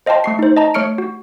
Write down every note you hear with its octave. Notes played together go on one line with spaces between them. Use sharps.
C5 D#5 F5 G5 A5 C6
A3 C#6 C7
D#4 C5
D#5 A5 A#5
A3 C#5 C#6 F6 C#7 D7
F#4